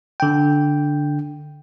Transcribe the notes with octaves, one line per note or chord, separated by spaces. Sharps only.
D3 G5